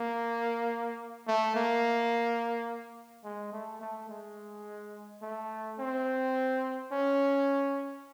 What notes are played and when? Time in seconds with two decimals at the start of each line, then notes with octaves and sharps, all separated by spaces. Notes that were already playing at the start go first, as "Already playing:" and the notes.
Already playing: A#3
1.28 A3
1.55 A#3
3.24 G#3
3.52 A3
3.81 A3
4.09 G#3
5.22 A3
5.79 C4
6.92 C#4